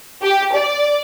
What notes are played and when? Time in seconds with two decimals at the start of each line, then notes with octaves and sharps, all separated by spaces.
0.22 G4
0.53 D5